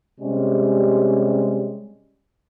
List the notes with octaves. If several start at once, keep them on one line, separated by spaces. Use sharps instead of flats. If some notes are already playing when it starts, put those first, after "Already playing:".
C3 G3 G#3 C#4